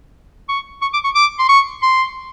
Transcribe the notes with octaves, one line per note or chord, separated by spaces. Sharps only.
C#6
C#6
D6
C#6
D6
C6
C#6
C6